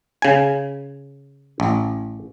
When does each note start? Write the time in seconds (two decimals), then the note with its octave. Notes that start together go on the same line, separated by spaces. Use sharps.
0.22 C#3 G#5
1.60 A1